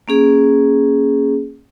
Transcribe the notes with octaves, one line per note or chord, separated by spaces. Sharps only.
A#3 C#4 G#4